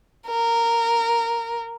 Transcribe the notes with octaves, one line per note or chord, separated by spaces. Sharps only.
A#4